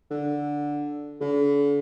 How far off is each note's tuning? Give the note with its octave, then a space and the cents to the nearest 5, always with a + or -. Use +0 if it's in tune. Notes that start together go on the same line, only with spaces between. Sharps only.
D3 -5
D3 -45